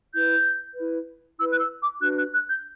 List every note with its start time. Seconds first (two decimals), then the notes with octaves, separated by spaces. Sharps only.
0.14 E4 B4 G6
0.76 E4 B4
1.39 E4 B4 E6
1.52 F#6
1.60 E6
1.81 D6
2.01 D4 F#4 B4 F#6
2.17 F#6
2.33 F#6
2.49 G6